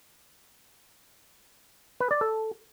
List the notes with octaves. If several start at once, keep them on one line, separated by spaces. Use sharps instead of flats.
B4
D5
A4